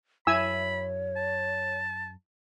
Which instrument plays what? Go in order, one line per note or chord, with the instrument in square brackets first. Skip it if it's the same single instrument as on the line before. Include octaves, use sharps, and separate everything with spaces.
[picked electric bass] F#2 [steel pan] E4 G#5 E6 [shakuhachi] C#5 [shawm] B5
[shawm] A5